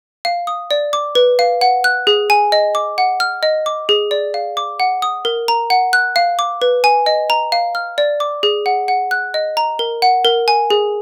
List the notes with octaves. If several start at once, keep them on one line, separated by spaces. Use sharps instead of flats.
F5
D#6
D5
D6
B4
F5
F#5
F#6
G#4
G#5
D#5
D6
F#5
F6
D#5
D6
G#4
D5
F5
D6
F#5
D#6
A#4
A#5
F#5
F#6
F5
D6
B4
G#5
D#5
A#5
F5
F6
D5
D6
G#4
F#5
F#5
F#6
D#5
A#5
A#4
F#5
A#4
G#5
G#4